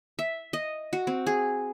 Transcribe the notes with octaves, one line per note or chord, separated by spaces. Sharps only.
E5
D#5
F#4
C4
G#4